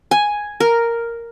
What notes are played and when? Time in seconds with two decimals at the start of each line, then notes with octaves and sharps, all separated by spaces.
0.11 G#5
0.60 A#4